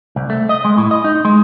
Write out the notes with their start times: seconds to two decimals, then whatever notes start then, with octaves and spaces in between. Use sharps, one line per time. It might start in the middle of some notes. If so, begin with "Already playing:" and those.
0.16 C2
0.30 A3
0.49 D#5
0.65 G#3
0.78 A2
0.91 D#5
1.04 D#4
1.25 G#3